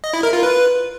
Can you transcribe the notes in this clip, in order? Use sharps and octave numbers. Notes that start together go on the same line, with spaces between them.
D#5
E4
A#4
F4
B4